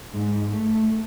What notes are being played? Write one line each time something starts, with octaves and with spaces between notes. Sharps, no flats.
G#2
A3